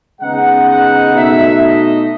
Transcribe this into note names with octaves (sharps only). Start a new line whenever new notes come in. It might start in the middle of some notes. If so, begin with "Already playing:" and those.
C#3 G#3 B3 D#4 F#5
F#5
B2 A3 D#4 E5
D#5